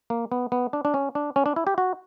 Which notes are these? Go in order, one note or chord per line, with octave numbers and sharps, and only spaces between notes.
A#3
B3
B3
D4
D4
C#4
D4
C#4
D4
E4
G4
F#4